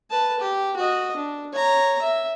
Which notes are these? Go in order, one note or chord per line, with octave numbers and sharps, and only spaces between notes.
B4 A5
G4
F#4 D#5
D4
C#5 A#5
E5